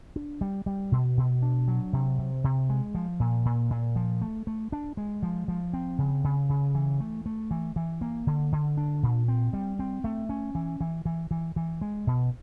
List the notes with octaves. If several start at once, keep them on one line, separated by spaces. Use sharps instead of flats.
D4
G3
G3
B2
B2
D4
F#3
C3
C3
C3
G#3
F3
A#2
A#2
A#2
F3
A3
A3
D4
G#3
F3
F3
C4
C#3
C#3
C#3
E3
A3
A3
E3
E3
A#3
D3
D3
D4
A#2
C4
G3
C4
A3
C#4
E3
E3
E3
E3
E3
G#3
B2